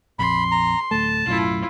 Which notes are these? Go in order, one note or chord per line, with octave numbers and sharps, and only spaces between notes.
A#1 F2 B5 C6
A#5
D1 A3 A5
B1 F#2 A2 E4 F4